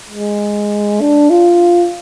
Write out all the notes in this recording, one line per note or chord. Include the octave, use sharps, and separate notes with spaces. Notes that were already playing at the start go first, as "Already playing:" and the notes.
G#3
D4
F4